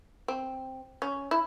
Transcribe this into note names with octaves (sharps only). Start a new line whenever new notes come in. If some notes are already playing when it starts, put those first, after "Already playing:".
C4
C#4
E4